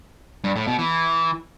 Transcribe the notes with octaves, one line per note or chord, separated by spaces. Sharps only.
G2
A2
B2
E3